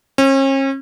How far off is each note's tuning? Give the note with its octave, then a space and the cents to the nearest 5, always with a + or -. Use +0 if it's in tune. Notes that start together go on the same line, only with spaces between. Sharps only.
C#4 -40